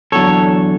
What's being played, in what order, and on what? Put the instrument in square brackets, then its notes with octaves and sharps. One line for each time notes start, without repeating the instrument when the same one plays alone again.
[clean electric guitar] E2 D3 F#3 A4 C#5